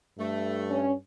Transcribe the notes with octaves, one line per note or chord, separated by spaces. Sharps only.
G2 A3
C#4